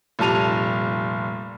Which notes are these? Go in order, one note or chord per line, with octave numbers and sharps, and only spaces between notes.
F1 A#2 G3 A5 D#7 F7